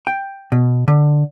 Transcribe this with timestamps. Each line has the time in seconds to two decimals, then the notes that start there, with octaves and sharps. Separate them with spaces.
0.07 G5
0.52 B2
0.88 D3